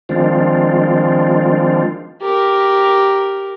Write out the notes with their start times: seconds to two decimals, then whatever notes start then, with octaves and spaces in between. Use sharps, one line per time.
0.09 D#3 F3 G#3 C4 D4 F4
2.22 G4 A#4